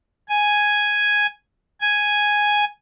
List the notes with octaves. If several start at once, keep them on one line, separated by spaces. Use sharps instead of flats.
G#5
G#5